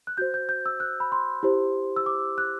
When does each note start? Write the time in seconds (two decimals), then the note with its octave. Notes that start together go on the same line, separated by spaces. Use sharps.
0.07 F#6
0.17 F#4 C5 G6
0.34 G6
0.49 G6
0.66 E6
0.80 F#6
1.00 B5
1.12 C6
1.43 E4 G4 C5
1.96 E6
2.06 D6
2.38 F#6